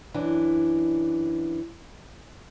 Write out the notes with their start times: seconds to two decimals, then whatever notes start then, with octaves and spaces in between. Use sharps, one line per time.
0.14 F#2 E3 D4